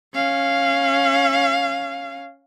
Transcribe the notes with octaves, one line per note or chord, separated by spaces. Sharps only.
C#4 F5